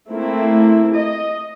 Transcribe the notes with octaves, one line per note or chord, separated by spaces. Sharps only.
A3 A#3 C4 E4
D#5